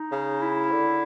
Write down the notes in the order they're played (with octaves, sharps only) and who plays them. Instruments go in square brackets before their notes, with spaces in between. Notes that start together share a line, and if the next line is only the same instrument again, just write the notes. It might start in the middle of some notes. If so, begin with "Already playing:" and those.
Already playing: [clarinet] D#4
[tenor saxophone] C#3
[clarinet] E4
[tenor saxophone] D3